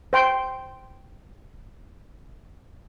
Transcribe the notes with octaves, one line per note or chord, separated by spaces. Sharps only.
C5 G5 C6